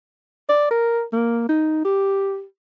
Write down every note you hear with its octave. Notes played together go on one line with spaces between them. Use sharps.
D5
A#4
A#3
D#4
G4